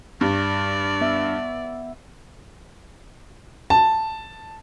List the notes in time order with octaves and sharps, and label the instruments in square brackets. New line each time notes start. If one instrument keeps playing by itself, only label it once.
[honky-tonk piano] G2 [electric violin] D5
[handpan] B3 E5
[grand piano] A5